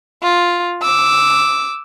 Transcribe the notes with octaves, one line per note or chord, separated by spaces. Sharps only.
F4
D6 E6